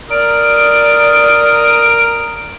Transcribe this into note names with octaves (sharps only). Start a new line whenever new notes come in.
A#4 D5 D#6 D7